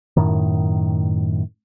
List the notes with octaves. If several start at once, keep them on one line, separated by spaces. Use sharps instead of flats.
F#2 A2 D#3